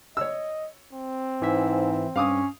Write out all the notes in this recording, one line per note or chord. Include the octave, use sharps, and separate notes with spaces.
C#5 D#5 E6
C4
G#2 E3 E5
G2 C#4 F5 D6 D#6